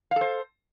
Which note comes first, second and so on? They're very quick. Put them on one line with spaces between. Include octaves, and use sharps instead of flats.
F5 A4 C5